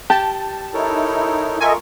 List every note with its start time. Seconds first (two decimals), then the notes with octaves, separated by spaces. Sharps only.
0.10 G4 A5
0.74 D#4 E4 A4 A#4 C#5
1.60 F4 A4 A#4 D#5 E5 G#5 C#6